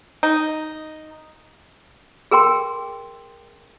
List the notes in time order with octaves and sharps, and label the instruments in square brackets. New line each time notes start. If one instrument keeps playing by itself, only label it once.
[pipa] D#4
[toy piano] G#4 A#4 G5 C6